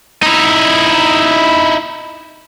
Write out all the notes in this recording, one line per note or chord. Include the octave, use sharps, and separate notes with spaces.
D#4 E4